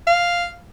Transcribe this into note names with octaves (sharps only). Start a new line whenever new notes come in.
F5